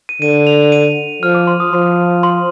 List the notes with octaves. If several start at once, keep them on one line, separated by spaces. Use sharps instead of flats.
D#7
D3 D#7
F7
D#7
F3 F6
D6
C6
D#6
F3 C6
C6